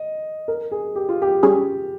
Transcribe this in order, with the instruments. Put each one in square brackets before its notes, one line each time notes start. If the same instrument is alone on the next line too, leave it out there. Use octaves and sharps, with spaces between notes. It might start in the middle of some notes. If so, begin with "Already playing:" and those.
Already playing: [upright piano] D#5
A#4
G#4
G4
F4
G4
[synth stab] G3 C#4 G#4